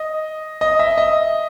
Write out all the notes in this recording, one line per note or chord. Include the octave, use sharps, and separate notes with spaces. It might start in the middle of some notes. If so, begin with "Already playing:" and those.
Already playing: D#5
D#5
E5
D#5